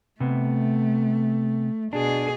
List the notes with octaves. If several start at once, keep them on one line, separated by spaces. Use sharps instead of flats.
C3 A3 B3
B2 D4 G#4